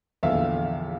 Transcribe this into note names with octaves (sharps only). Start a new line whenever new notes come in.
A#1 E2 D3 E5 F5